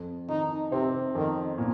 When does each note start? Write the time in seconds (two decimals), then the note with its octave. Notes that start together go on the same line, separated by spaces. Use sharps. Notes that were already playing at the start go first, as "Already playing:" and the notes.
Already playing: F2
0.28 D#3 D#4
0.71 C3 C4
1.15 F2 D#3
1.58 A#2